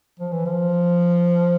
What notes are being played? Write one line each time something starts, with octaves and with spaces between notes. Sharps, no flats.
F3
E3
F3